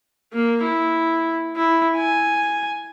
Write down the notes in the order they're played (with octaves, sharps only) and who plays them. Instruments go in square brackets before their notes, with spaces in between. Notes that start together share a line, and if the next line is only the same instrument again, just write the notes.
[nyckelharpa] A#3
E4
E4
G#5